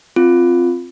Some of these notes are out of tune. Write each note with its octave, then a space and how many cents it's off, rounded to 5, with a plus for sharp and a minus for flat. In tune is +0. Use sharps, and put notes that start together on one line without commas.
C4 +0 F4 +0